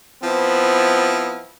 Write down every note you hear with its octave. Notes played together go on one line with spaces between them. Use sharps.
F3 B3 C4 E4